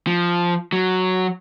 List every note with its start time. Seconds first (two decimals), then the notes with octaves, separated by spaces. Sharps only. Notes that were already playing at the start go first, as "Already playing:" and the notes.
0.07 F3
0.73 F#3